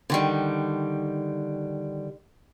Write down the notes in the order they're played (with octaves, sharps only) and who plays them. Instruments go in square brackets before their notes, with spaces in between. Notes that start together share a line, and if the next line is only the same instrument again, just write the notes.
[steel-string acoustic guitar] D3 D#3 G3